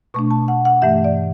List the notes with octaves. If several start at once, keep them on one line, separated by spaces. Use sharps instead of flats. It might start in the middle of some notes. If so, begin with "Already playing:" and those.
B2 A3 D4 C#6
A5
F#5
F#5
G2 E3 A3 E5
D5